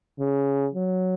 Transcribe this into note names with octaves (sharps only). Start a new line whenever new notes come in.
C#3
F#3